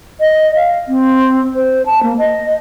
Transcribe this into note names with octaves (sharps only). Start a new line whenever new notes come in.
D#5
F5
C4
C5
A5
A#3
D#5